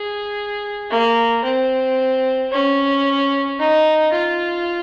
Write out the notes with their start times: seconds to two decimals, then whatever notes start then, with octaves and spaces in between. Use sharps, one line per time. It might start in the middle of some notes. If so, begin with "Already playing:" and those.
Already playing: G#4
0.91 A#3
1.44 C4
2.51 C#4
3.59 D#4
4.13 F4